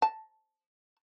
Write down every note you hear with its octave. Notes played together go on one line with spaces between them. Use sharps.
A5